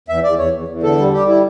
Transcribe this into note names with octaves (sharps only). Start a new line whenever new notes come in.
E2 E5
E2 D5
E2 C#5
E2
E2
D3 A4
G3
G3 G4
E4